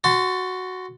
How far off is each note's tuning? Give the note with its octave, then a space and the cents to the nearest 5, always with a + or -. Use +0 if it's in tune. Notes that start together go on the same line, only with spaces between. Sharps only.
F#4 +0 A5 +15 C6 -20